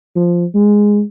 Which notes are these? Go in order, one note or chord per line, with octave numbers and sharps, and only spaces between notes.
F3
G#3